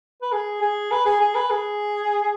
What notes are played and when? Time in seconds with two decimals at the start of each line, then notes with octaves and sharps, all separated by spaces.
0.22 B4
0.32 G#4
0.62 G#4
0.91 B4
1.05 G#4
1.20 G#4
1.35 B4
1.50 G#4